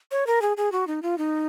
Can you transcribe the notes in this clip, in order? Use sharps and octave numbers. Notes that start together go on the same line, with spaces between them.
C#5
A#4
G#4
G#4
F#4
D#4
F4
D#4